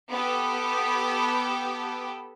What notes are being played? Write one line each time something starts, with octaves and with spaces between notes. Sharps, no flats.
B3 G4 A4